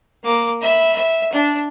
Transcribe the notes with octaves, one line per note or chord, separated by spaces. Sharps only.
A#3 D6
E5 B5
E5
D4